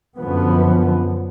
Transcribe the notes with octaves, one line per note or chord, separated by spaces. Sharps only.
F#2 D3 F3 B3